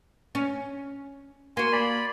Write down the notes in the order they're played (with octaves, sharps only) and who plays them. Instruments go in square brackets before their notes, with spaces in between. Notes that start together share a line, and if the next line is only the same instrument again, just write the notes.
[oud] C#4
[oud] A#3 F#4 [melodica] G#5 C6
[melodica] D5 B5